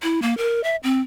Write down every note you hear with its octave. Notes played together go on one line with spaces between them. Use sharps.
E4
A#3
A#4
E5
C4